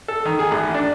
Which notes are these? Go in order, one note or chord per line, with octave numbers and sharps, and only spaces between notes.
A4
D#3
G#4
A1
D4